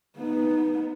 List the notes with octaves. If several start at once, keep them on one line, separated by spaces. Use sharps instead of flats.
B3 D#4